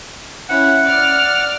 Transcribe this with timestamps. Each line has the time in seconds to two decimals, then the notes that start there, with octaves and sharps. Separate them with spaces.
0.49 C#4 E4 F#5
0.85 D5 F6